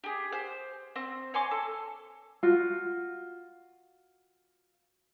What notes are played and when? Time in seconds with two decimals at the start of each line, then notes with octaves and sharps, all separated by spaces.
0.04 G4 G#4
0.32 C5
0.96 C4
1.34 C#5 G#5 C6 D6
1.51 A4
2.43 F4 F#4